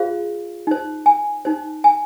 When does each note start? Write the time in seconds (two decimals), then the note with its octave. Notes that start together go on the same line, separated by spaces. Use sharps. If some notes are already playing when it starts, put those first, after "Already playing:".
Already playing: F4 G#4 C5 F5
0.67 D#4 C5
1.06 G#5
1.45 D#4 C5
1.84 G#5